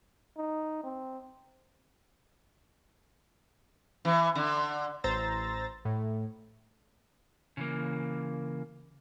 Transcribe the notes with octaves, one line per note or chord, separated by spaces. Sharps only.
D#4
C4
E3
D3
A1 C5 A#5 E6 A6 A#6
A2
C#3 E3 A#3